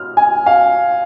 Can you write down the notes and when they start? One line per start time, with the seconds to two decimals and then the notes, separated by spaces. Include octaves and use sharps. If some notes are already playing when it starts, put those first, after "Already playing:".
Already playing: F6
0.17 G#5
0.46 F5